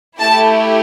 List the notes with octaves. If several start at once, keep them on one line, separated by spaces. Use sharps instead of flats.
A3 E4 G4 A5